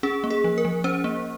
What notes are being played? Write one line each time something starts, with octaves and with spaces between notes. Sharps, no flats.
C#4 G#4
A#3
G#4
F3
A#4
F3
C#4 C5
A#3